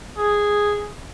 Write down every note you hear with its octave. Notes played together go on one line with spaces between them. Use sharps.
G#4